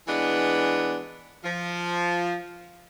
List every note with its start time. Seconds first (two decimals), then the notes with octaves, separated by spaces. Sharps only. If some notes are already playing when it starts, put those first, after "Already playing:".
0.08 E3 G#3 B3 D4
1.45 F3